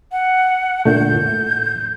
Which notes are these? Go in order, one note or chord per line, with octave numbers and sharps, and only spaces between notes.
F#5
A#2 D3 A3 G6
A2